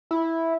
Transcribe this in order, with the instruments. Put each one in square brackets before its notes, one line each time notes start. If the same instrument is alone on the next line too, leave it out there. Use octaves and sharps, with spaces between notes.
[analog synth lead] E4